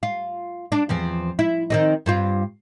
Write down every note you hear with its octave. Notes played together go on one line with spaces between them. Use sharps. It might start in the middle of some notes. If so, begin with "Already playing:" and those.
F4
D4
E2 F3 C4
E4
D#3 C4 D#4
G2 C4 F4